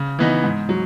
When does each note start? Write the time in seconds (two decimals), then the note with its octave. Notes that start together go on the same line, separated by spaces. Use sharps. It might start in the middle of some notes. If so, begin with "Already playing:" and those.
Already playing: C#3
0.19 E3 B3 D#4
0.44 G#2
0.69 F#3